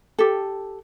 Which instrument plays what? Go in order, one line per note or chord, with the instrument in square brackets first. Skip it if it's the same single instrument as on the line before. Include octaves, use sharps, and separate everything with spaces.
[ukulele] G4 A4